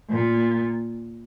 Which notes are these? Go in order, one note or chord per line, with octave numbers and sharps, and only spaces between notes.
A#2